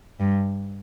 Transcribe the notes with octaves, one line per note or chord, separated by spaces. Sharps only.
G2